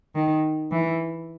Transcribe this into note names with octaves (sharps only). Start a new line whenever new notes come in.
D#3
E3